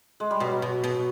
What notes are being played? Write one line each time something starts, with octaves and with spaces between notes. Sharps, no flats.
G#3
G3
B2 F#3
B2
B2